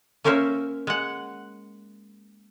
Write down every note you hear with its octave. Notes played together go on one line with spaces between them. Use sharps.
A#3 C#4 A#4 C5 C#5 E5
G#3 F#5